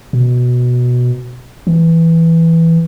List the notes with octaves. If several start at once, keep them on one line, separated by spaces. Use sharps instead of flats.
B2
E3